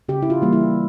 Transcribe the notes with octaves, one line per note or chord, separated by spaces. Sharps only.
C#3 G4
E4
F4
E3 G3 A#3
E4